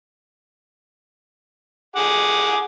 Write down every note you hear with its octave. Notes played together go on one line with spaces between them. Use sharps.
G#4 F#5 D6